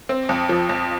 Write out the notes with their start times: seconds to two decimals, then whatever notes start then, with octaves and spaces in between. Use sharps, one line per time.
0.09 C4
0.29 F2
0.49 F3
0.69 F2